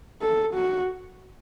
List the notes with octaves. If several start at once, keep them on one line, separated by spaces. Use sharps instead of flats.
A4
F#4